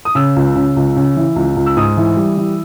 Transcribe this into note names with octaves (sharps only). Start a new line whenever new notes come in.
D#6
C#3 E6
C#2
C#3
C#2
C#3
E3
C#2
C#2
E6
G#2 D#6
E3
G3
E3